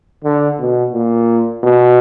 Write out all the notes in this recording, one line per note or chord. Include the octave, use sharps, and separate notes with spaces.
D3
B2
A#2
B2